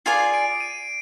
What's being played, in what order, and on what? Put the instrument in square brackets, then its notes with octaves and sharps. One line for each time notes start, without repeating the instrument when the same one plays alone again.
[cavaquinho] F4 G#4 D5 G#5 [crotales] C7
[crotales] D7
D#7